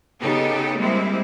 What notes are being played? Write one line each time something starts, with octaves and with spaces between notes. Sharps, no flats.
C#3 B3 D#4 G4 A4
G3 G#3 A#3 C4 E4